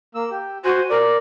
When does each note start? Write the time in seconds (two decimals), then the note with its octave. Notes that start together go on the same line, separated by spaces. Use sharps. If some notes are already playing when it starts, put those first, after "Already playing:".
0.15 A#3 E6
0.31 G4
0.65 F#4 C5 G#5
0.90 A#4 D5